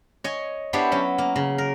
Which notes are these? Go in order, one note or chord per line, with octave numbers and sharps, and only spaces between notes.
C#5 D#5 G#5
B3 D4 E4 G4 C5 C#5
F#3 C#4
A#3
C#3
A#4